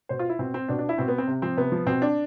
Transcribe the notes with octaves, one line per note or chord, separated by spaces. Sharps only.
B2 C5
F4
E4
B2 C4
C4
B2 D4
D4
E4
B2 C4
B3
C4
C3
F3 C4
C3 B3
F3
B2 C4
D4